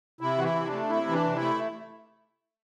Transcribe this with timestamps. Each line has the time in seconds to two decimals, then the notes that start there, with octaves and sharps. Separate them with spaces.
0.21 C3 E4
0.38 E3 F#4
0.44 E4
0.55 C3
0.67 D4
0.72 A3
0.90 C3 E4
1.07 E3
1.13 D4
1.24 C3
1.36 E4
1.41 A3